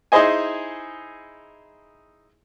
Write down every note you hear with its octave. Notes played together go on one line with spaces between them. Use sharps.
D#4 E4 G#4 C5 D#5 G#5